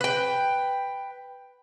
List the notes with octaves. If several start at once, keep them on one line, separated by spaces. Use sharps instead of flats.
B4 G5